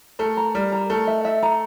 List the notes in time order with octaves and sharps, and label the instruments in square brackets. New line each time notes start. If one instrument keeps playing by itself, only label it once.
[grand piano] A3 [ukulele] A#4
[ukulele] A#5
[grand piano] G3 [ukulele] A#4
[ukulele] A#5
[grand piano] A3 [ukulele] A#4
[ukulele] E5
E5
A#5